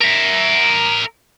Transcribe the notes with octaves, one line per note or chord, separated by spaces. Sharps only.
A#4 E5